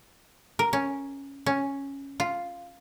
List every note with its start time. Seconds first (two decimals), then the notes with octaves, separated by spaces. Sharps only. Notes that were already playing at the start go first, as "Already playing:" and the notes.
0.59 A#4
0.73 C#4
1.46 C#4
2.20 F4